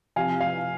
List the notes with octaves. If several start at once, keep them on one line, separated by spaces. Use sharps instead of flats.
C3 F3 F5 G#5
F5